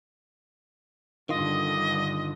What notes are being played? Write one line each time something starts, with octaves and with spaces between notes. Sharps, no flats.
G2 D3 D#3 F4 D#5